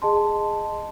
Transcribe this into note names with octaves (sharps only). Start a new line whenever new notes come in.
G#4 D#5 A5 C6